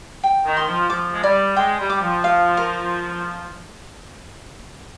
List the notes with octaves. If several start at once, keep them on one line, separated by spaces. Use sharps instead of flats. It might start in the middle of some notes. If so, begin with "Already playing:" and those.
G5
D#3
C6
F3
F3 D6
G#3
G3 D5
G#3 G5
G3
D6
F3
F5
A#4